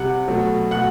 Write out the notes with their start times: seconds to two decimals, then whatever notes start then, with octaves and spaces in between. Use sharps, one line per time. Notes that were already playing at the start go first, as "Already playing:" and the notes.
Already playing: C3 G3 F#5 F#6
0.27 B2 F#3 A3
0.71 B2 A3 F#5 F#6